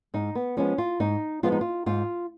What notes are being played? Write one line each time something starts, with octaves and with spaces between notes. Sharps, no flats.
G#2 D#4
B3
F3 G#3 B3 C#4
F4
G#2 D#4
F3 G#3 B3 F4
D#4
F4
G#2 F4